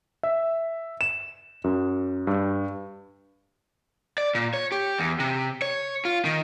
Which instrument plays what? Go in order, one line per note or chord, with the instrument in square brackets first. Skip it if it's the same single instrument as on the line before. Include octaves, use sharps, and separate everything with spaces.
[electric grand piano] E5
E7
F#2
G2
[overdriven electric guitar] D5
A#2
C#5
G4
E2
C3
C#5
F4
D#3